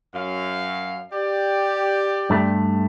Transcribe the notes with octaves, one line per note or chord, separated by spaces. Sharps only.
F#2 F5
G4 D5
G2 A3